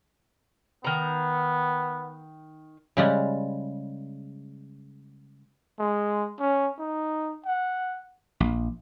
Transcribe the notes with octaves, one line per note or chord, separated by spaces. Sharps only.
D#3 B3 A#5
C#3 G3 G#3
G#3
C#4
D#4
F#5
A#1